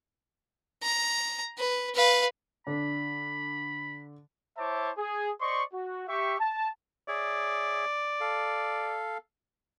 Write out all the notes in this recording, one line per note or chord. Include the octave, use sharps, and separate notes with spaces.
A#5
B4
B4 F5
D3 D4 B5
E4 C5 C#5 E5 A5 D6
G#4
C5 D5 D#5 C6 C#6
F#4
G4 E5 C#6
A5
G#4 C#5 D5 E5
A4 F5